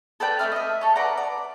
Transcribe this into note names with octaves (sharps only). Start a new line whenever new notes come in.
A4 B4 D5 G5
A3 C#4 E5 F6
D#5 E5
A4 C#5
B4 D5 F#5 A#5
D5